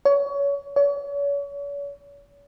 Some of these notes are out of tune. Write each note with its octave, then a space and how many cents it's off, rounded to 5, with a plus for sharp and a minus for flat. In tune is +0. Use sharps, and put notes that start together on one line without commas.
C#5 +25
C#5 +40